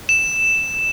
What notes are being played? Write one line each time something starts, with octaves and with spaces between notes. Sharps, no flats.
E7